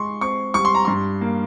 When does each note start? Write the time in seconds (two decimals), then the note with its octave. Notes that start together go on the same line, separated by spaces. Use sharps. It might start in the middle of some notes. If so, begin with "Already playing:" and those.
Already playing: G#3 C6 C#6
0.21 C4 C#6
0.54 G3 C#6
0.65 C6
0.75 A#5
0.85 G2 C6
1.21 A#3